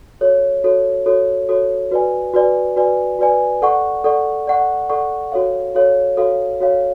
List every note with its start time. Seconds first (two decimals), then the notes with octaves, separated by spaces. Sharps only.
0.21 F#4 A4 C#5
0.64 F#4 A4 C#5
1.06 F#4 A4 C#5
1.49 F#4 A4 C#5
1.91 F#4 B4 D5 G#5
2.33 F#4 B4 D5 G#5
2.76 F#4 B4 D5 G#5
3.19 F#4 B4 D5 G#5
3.62 A4 D5 F#5 C#6
4.04 A4 D5 F#5 C#6
4.47 A4 D5 F#5 C#6
4.89 A4 D5 F#5 C#6
5.32 F#4 A4 C#5 F5
5.75 F#4 A4 C#5 F5
6.17 F#4 A4 C#5 F5
6.60 F#4 A4 C#5 F5